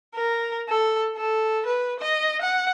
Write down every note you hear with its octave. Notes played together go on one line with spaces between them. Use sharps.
A#4
A4
A4
B4
D#5
F#5